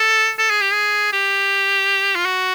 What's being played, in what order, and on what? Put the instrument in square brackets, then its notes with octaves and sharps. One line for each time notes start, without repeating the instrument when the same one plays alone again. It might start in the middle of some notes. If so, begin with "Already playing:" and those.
Already playing: [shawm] A4
A4
G#4
G4
G#4
G4
F4
F#4